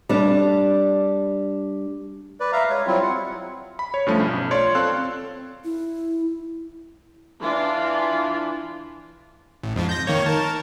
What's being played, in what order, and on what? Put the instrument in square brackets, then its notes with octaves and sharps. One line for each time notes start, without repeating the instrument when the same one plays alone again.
[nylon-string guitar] G3 D4
[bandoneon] B4 D5
E5 F5 A#5
G#3 C#5
F#3 G3 C4 E4 F4
F#5
[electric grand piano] B5
C#5
G2 F3 A3 C#4
B1
F4 C#5 D5 C6
C4 A4 F5 C6 F#6
[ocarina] E4
[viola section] E3 D4 F4
[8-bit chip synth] A1
F2 G#2 F3
G6 A#6
D#3 A#3 C#5
A#4 A5